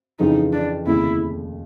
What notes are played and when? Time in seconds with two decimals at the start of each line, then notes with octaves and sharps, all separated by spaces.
0.19 F2 C#3 E3 D#4
0.53 D4
0.86 F1 D#2 C#3 E4